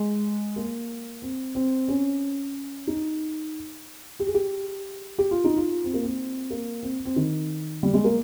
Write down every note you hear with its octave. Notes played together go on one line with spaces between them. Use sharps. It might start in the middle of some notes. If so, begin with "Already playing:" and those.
Already playing: G#3
A#3
C4
C4
C#4
D#4
G4
G#4
G4
G4
F4
D#4
F4
C4
A#3
C4
A#3
C4
C4
D#3
G3
G#3
A#3